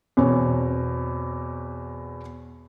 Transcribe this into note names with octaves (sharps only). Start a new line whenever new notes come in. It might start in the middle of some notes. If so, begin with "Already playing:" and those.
E2 B2 C4 C#5